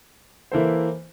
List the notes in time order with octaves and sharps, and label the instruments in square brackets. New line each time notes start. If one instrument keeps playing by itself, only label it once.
[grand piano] E3 A#3 E4 A4 C5